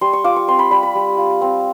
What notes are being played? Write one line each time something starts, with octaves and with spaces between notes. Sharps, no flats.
G3 C6
C#6
F4 D6
C#6
C4 C6
B5
G3 B5
B5
G3
F4
C4